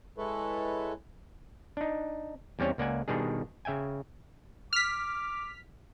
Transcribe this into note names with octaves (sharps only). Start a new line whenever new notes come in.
G#3 E4 A4 B4 C#5
D4 D#4
E2 G3 C4 C#4 C#5
C#2 A#3 D5 F#5 G#5
B2 D#3 G3 D4 G#4
C#3 E5 G5 G#5
D6 F6 B6